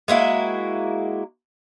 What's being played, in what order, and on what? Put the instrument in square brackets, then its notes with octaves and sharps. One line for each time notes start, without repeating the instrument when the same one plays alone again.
[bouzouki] G#3 A#3 E4 F#4